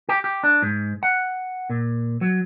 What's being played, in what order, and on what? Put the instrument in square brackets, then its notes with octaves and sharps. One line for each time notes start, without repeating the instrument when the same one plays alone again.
[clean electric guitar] G4
G4
D4
G#2
F#5
A#2
F#3